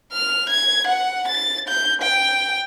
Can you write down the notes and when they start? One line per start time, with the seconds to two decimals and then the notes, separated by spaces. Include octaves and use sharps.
0.13 F6
0.50 G#6
0.87 F#5
1.28 A6
1.69 G6
2.02 G5